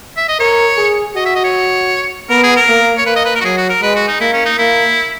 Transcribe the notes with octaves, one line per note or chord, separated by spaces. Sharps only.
E5
D#5
A#4 C#5
G#4
F#4 D#5
E5
D#5
C#5
B3 A#4
G#4
A#4
A#3
C#5
A#3 B4
D#5
B4
A#4
F#4
F#3 G#4
F#4
A#4
G#3 B4
F#4
D#4
A#3 E4
C#4
D#4
A#3 E4